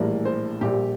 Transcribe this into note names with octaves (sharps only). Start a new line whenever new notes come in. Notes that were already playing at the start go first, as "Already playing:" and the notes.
Already playing: A#1 A2 E3 G3 A#3
C5
A#1 A#2 G3 G4